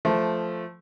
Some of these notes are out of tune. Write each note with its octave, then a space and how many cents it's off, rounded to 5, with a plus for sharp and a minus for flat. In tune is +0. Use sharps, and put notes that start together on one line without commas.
F3 +0 A3 +0